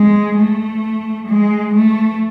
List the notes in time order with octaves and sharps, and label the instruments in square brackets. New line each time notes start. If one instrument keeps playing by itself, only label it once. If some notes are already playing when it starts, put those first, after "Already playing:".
Already playing: [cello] G#3
A3
G#3
A3